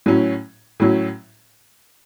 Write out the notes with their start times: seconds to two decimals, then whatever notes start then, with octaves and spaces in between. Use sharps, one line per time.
0.06 A2 F#3 C#4
0.80 A2 F#3 C#4